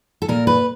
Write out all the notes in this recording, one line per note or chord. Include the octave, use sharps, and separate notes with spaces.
A4
A#2 A#4
B4